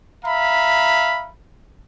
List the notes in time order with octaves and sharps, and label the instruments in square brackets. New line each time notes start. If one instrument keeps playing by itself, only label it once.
[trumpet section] E5 F5 A#5 B5